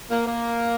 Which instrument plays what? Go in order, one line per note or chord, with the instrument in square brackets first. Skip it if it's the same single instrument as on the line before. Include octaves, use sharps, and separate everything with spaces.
[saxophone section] A#3
A#3